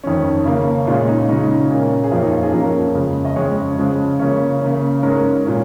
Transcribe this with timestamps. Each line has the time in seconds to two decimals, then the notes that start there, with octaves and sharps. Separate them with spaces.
0.04 F2 D#3 C#4
0.45 C#3 A#3 C#4
0.87 A#2 G#3 C#4 F4
1.08 D#4
1.29 C#3 G#3 C#4 D#4
1.70 A#2 A#3 C#4
2.04 G#4
2.11 F2 F3 A#3 C#4 F4
2.22 D#4
2.32 F4
2.43 G#4
2.53 F2 F3 A#3 C#4 A#4
2.95 F2 C#3 G#3
3.25 D#5
3.36 F2 C#3 G#3 C#4 C#5
3.78 C#3 F3 G#3 C#4
4.19 C#3 A#3 C#4 C#5
4.61 C#3 A#3 C#4
5.02 G#2 G#3 C#4 A#4
5.44 A#2 A#3 C#4